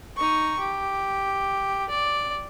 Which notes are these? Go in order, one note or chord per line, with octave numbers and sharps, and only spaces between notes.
D#4 C#6
G4
D5